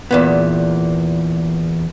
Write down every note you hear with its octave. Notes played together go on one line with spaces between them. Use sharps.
E2 A#2 B3